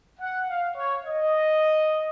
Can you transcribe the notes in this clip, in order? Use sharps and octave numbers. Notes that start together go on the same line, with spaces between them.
F#5
F5
C#5
D#5